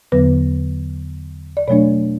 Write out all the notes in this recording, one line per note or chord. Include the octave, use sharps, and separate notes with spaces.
E2 D3 F#3 B3 B4
D5
B2 F#3 A3 D4 C#5